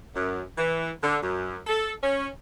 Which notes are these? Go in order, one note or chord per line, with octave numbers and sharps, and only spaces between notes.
F#2
E3
D3
F#2
A4
C#4